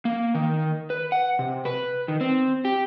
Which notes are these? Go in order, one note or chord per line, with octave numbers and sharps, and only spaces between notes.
A#3
D#3
B4
F#5
C3
B4
D#3
C4
G4